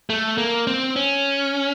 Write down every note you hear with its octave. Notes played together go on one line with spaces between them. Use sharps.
A3
A#3
C4
C#4